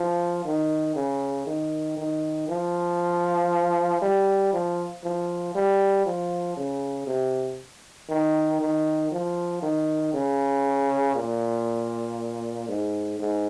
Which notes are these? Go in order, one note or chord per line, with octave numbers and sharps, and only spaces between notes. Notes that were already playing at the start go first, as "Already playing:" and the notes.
Already playing: F3
D#3
C#3
D#3
D#3
F3
G3
F3
F3
G3
F3
C#3
C3
D#3
D#3
F3
D#3
C#3
A#2
G#2
G#2